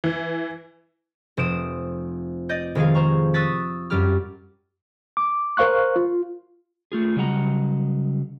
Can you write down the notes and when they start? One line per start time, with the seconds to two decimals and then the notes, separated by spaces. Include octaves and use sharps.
0.04 E3
1.37 F1 C5 D#6 D7 E7
2.49 D5 D#5 G6
2.75 F1 D#3 G#3 G#4 F5
2.94 C5 A#5 C#6
3.34 C#6 D#6 E6 F#6 A6 B6
3.90 F#2 G3 G4 D6 F6
5.17 D6
5.57 A#4 C5 F5 C#6 F#6
5.96 F4
6.92 A3 F4 G#4
7.16 C#3 F#3 G3 D#5 F#5 A#5